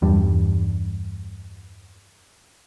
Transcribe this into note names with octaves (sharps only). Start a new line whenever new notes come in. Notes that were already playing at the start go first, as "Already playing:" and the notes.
E2 G2 G3